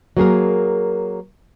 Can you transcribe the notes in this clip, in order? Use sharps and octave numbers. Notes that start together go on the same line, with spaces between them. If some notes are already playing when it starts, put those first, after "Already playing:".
F#3 A#3 G#4 A#4